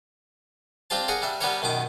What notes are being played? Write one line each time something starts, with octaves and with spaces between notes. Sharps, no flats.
C4 D4 F4 G4 C5 A5
G#4 A#4 D5 F#5 A#5
G3 D4 E5
G3 B3 D4 G4 A#4 C#5
F#2 B2 D#3 D6